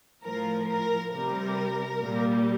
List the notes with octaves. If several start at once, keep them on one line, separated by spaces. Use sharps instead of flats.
A2 F3 A#4
A#4
C3 G3 A#4
A#2 G3